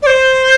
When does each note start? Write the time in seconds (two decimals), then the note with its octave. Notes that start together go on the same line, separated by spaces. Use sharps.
0.02 D5
0.07 C5